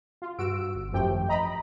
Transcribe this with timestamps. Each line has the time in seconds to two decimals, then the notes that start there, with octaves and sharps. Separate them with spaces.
0.22 F4
0.38 G2 F#4 E6 D7
0.75 G1
0.92 G#1 F#2 F3 A3 G4 G5
1.29 D#5 A#5 B5